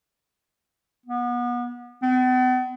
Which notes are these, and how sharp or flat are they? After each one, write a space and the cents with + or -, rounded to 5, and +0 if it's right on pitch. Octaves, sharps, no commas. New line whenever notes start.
B3 -30
B3 +45